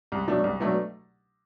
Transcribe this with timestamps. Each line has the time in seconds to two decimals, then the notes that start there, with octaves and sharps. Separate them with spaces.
0.12 C2
0.27 B2 F#3 A3 D4
0.44 C2
0.60 B2 F#3 A3 D4